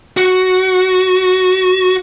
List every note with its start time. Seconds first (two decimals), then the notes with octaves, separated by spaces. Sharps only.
0.17 F#4